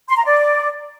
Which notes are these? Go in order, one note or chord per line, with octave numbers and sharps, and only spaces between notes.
C6
A#5
D5